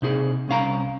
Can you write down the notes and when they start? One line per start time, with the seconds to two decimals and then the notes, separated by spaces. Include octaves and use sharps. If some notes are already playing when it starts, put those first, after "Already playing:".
0.02 C3 D#4 G#4
0.48 C2 C#4 F5 A#5